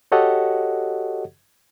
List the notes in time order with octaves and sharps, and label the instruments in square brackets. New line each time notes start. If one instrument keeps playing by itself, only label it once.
[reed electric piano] F#4 G4 A4 C#5 D#5 F#5